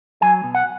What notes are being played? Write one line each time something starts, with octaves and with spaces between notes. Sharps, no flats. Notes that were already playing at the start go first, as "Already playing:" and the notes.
F#3 G#5
B2
F#5